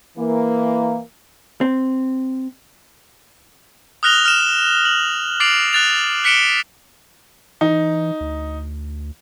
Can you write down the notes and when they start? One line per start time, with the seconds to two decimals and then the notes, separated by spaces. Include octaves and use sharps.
0.17 E3 A#3
1.61 C4
4.03 D#6 F6 F#6 A#6 F7 G7
4.25 F6 E7
4.85 F#7
5.40 D6 A6 C7 D7 F7 F#7
5.73 F#6 A6 F7
6.24 F#6 B6 C#7 D7 E7 G7
7.61 E3 D#4
8.20 D2